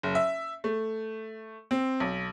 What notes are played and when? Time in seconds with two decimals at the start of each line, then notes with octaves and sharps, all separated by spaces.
0.03 F#1
0.15 E5
0.64 A3
1.71 C4
2.00 B1